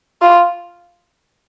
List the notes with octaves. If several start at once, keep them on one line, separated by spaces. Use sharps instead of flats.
F4